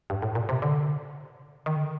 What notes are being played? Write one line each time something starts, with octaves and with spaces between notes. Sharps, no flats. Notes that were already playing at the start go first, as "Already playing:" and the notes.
G2
A2
A#2
C3
D3
D#3
D3